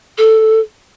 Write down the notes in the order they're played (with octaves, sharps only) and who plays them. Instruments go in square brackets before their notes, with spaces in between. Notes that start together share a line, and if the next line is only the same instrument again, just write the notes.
[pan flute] A4